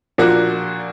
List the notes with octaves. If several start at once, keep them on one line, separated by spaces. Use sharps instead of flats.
A#2 F3 A#3 D4 F#4